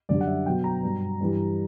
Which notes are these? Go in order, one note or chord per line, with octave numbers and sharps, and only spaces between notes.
F#2 D3 G3 D5
F#5
E5
B2 F#3 G5
A#5
G2 F#3
G2 E3 G3